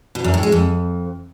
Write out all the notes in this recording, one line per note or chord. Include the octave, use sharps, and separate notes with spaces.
B2
F#2
A2
G#3
F2